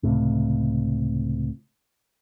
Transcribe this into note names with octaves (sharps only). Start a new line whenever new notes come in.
C#2 A2 C3